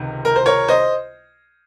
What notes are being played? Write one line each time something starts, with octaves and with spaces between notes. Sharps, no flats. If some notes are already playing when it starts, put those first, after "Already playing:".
Already playing: C#2 C3 D#3
A#4
C5
A#4 C#5
C5 D#5